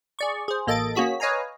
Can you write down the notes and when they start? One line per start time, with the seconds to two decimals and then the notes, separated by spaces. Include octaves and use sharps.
0.19 G#4 D5 C#6
0.48 G#4 C5
0.67 A1 A#3 A4 D#5 A6 D7
0.95 A#3 C#4 F#4 G#4 B6
1.20 B4 C#5 D#5 F5 G#5 A#5